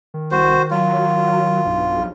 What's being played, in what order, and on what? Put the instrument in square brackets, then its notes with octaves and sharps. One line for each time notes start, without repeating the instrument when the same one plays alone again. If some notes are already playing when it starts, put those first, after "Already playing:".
[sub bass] D#3
[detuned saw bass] C2 [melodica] F#4 C5
[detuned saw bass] F#3 [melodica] F4
[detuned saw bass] B1 [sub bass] G2
[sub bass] A#1